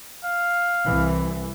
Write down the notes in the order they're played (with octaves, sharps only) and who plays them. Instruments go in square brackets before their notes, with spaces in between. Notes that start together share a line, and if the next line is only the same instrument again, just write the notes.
[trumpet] F5
[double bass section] C2 E3